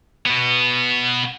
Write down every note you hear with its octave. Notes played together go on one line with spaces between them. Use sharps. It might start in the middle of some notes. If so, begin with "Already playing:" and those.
B2 B3